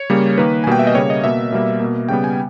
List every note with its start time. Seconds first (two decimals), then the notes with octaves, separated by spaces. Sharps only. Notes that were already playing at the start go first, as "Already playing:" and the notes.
Already playing: C#5
0.10 C#3 G3 A#3
0.38 D#3 A#3 B4
0.64 G#5
0.67 B2 G3 A#3 G5
0.79 E5
0.87 D#5
0.95 C#3 G3 A#3 C#5
1.10 D#5
1.24 B2 A#3 E5
1.52 B2 G3 A#3
1.80 B2 A#3
2.09 C#3 G3 B3 G5
2.24 G#5